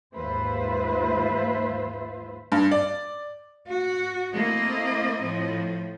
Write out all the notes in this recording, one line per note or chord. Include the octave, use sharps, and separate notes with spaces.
D#2 G#2 F4 B4 C5 E5
G2
D5
F#4
A3 A#3 C4 E4 D#5
A2 F3